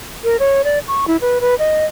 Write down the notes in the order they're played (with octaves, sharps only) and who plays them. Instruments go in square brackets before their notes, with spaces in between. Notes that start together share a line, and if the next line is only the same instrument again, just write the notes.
[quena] A#4
C#5
D5
C#6
E4
B4
B4
D#5